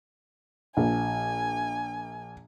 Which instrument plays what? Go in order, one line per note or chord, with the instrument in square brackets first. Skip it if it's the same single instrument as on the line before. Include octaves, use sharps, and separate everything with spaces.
[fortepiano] A#1 [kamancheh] G#5